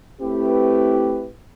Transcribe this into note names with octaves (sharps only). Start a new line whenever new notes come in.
A3 C4 E4 G4 B4